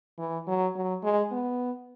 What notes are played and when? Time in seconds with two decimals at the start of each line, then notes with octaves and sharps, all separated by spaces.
0.18 E3
0.47 F#3
0.75 F#3
1.03 G#3
1.32 B3